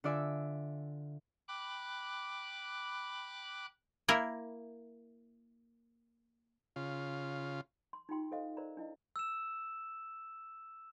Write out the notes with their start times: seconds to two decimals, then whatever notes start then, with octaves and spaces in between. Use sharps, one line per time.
0.04 D3 F4 D5 E5 G#5
1.48 G5 B5 D6 F#6
4.08 A#3 E4 A#4
6.76 C#3 F4
7.93 C6
8.09 D#4 F4 G4 G5 C6
8.31 A4 C5 D#5 F5
8.57 A#4 C5 D5 A#5
8.77 D4 E4 D#5
9.16 E6 E7